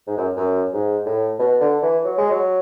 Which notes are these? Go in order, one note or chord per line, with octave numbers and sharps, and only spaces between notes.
G#2
F#2
F#2
G#2
A2
B2
D3
E3
F#3
G#3
F#3